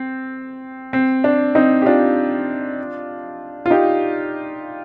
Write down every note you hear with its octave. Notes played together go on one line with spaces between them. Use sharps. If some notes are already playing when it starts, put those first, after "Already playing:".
Already playing: C4
C4
D4
C4 D#4
G4
D4 F4
F4
D#4 G4